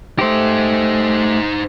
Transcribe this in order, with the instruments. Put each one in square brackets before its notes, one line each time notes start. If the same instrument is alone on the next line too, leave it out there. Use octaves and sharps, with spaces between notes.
[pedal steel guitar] A3 G4 [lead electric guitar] D#4 C5